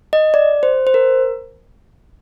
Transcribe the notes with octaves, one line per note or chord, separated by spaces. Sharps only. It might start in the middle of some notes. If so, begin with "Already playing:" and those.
D#5
D5
C5
C5
A#4